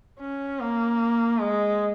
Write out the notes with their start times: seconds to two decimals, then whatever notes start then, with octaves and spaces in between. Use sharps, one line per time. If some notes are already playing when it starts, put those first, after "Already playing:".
0.20 C#4
0.60 A#3
1.40 G#3